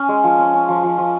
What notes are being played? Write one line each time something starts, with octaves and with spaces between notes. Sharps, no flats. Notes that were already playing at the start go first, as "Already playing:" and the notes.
Already playing: C#4
G#3
F3
C#4
C#4
F3
F3
F3